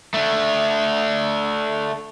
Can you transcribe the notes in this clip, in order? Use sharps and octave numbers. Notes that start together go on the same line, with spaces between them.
A3 D4